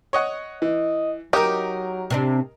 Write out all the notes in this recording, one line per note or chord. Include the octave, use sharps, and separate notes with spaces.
C#5 D#5 F#5
E3 D#5
F#3 D#4 G4 A#4 D#5
C3 C4 D4